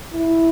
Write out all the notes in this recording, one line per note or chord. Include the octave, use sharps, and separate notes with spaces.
E4